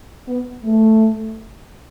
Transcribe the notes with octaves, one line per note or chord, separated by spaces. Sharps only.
B3
A3